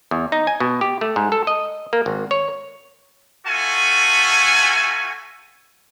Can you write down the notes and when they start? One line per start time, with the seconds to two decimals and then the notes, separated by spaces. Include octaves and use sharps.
0.11 E2
0.32 D#4
0.47 G#5
0.60 B2
0.81 G4
1.01 A3
1.16 G#2
1.32 A4
1.47 D#5
1.93 A#3
2.06 G#1
2.31 C#5
3.46 A3 F4 F#4 A4 G#5